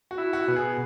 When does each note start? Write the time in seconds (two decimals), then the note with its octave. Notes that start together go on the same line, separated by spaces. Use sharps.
0.11 F#4
0.18 E4
0.33 F#4
0.48 B2
0.56 G#4